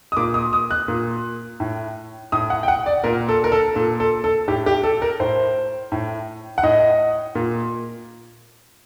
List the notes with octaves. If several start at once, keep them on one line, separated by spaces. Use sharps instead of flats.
D#6
A#2 D6
D#6
D#6
F#6
A#2
A2
A2 D#6
F#5
G5
F#5
D5
A#2 A#4
A4
A#4
A4
A#2 A4
A4
A4
A2 G4
G4
A4
A#4
A2 C5
A2
F#5
A2 D#5
A#2